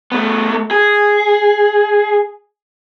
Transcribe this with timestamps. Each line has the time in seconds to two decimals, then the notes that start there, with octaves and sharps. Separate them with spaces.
0.12 A3 B3
0.71 G#4